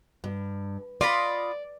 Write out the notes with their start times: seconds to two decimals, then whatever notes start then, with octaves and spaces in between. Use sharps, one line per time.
0.24 G2
1.01 F4 D5 D#5 B5